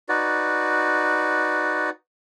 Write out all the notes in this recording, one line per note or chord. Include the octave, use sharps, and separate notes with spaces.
D#4 F#4 B4 D5